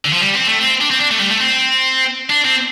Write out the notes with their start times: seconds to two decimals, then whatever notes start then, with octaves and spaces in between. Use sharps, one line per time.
0.05 D3
0.13 F3
0.21 G3
0.35 C4
0.47 A3
0.60 C4
0.81 D4
0.91 C4
1.00 D4
1.11 A3
1.20 G3
1.30 A3
1.40 C4
2.30 D4
2.45 C4